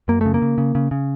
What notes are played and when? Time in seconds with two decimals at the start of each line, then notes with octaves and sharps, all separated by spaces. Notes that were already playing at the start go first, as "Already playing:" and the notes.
0.08 F#2 A#3
0.21 C#3 A3
0.34 A#3
0.42 C#3
0.58 C#3
0.75 C#3
0.91 C#3